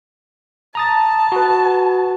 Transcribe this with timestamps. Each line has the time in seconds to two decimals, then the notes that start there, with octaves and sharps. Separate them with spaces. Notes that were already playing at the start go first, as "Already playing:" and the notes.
0.75 A5 A#5 D#6 A6
1.32 F#4 B4